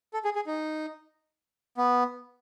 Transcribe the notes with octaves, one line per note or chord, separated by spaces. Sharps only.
A4
G#4
G#4
D#4
B3